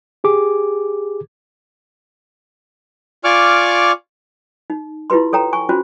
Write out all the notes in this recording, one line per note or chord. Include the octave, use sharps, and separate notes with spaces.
G4 G#4 D6
F4 D5 G#5 C#6 D6 F6
D#4
E4 F4 G4 B4 C6
A4 C#5 G5 A#5
G#5 C#6
C#4 F4 F#4 C5